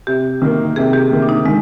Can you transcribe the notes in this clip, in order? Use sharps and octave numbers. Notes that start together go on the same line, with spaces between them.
C3 G4
D#3 A#3
C3 G#4
G4
D#3 A#3
D4
D#4
D#3 G#3